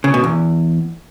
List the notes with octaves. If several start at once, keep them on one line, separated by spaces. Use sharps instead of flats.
C#3
B2
E2